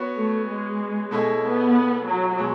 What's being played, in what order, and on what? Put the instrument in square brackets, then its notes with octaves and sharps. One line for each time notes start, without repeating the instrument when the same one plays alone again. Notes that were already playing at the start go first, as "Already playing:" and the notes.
Already playing: [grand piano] B3 F#4 C#5
[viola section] A3
G#3
[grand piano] B2 A3 E4 G#4 D#5
[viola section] B3
F#3
[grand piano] B2 G#3